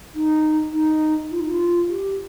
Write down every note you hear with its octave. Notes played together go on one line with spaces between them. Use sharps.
D#4
D#4
F4
D#4
F4
G4